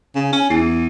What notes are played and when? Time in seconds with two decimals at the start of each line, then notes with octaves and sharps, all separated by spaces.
0.15 C#3
0.32 C#4
0.50 E2